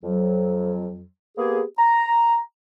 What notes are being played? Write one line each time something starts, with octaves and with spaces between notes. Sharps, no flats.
F2 F#3
A#3 B3 G4 G#4
A#5